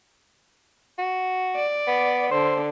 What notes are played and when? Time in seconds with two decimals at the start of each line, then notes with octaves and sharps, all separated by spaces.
0.98 F#4
1.56 D5
1.87 B3
2.31 D3 C5